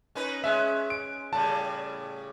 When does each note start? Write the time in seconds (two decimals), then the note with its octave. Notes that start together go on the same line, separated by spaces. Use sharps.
0.15 C#4 D#4 B4
0.44 G#3 C#4 E5
0.90 D7
1.33 A2 C#3 G3 A5